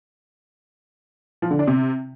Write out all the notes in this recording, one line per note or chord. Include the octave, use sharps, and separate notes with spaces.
F3
D3
D4
C3